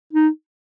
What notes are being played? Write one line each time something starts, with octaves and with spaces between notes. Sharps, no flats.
D#4